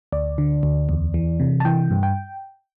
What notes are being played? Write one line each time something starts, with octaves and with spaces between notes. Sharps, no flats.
D2 D5
D3
D2
E2
E3
C3
A5
E3 G5
G2
G5